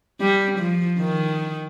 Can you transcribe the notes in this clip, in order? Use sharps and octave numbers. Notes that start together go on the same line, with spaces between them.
G3
F3
D#3